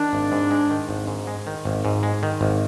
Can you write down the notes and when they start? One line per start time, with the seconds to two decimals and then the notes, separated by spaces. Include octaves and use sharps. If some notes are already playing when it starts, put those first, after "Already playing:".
Already playing: D#3 D4
0.13 G#1
0.32 G#2
0.51 G#3
0.70 D#3
0.89 G#1
1.07 G#2
1.27 G#3
1.47 D#3
1.65 G#1
1.85 G#2
2.03 G#3
2.23 D#3
2.41 G#1